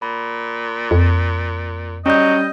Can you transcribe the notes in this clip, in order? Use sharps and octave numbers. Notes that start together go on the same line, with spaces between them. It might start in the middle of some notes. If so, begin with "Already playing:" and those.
A#2 B5
F2
F#3 G3 C#4 D#5 G6